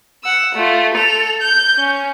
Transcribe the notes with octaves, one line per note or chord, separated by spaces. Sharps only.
F#5 E6
A3 F4
A4 F7
G6
C#4